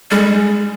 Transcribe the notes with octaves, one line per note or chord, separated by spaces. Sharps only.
G3 G#3